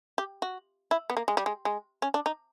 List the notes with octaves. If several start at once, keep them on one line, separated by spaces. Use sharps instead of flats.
G4
F#4
E4
B3
A#3
G#3
G3
G#3
G#3
C#4
D4
D#4